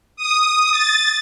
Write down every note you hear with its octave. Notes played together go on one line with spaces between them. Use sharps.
D#6
A6